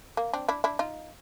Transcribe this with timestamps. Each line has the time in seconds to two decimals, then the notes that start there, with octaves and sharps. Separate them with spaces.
0.17 A#3
0.33 C4 D4
0.48 D4 E4
0.64 D4 E4
0.79 D#4 F4